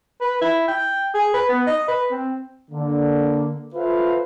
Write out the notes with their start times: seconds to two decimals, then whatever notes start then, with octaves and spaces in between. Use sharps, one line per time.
0.21 B4
0.41 E4
0.68 G5
1.14 G#4
1.34 B4
1.49 B3
1.67 D#5
1.88 B4
2.11 C4
2.71 D3 A#3
3.75 F4 A4 B4 C5 E5 F5